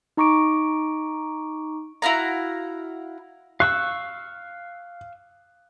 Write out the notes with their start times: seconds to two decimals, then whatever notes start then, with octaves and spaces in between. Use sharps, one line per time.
0.17 D#4 A#5 C#6 D6 D7
2.02 E4 F#4 F5 A#5
3.60 F5 C#6 E6 F#6